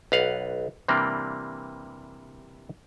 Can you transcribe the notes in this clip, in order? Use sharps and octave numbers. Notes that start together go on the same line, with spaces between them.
B1 B4 F5 F#5
C3 E3 G3 A#3 C4 D4